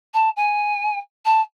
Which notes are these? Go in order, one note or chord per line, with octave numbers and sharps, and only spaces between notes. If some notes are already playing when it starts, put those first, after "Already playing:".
A5
G#5
A5